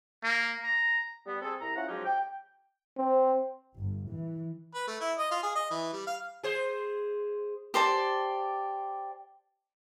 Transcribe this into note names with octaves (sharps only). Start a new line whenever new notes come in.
A#3
A#5
G3 B3
C4 G#4 A4
C2 A#5
C#4 E4 F4 F#5
F3 F#3 G#3 C#4 D#4 G4
G5
C4
G1
E3
B4
A3
E4
D#5
F4
G#4
D#5
E3
G3
F5
G#4 C5
G4 C5 D5 A5